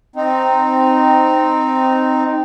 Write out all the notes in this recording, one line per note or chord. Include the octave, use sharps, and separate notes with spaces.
C4 D#4